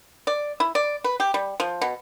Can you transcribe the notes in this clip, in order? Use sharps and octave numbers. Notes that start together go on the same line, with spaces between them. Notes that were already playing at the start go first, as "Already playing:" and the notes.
D5
E4
D5
B4
G4
G3
F3
B2